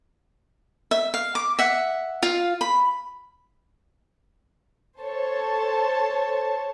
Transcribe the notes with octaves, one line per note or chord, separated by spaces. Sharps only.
E5
F5
D6
E5 F#5
F4 F5
B5
A4 C5 C#5 A5